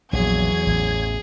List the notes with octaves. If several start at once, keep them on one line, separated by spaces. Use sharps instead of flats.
A#1 E2 F#3 G#4 G#6
A1